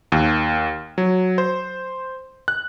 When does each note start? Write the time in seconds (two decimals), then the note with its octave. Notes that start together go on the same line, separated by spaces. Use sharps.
0.12 D#2
0.98 F#3
1.38 C5
2.48 F#6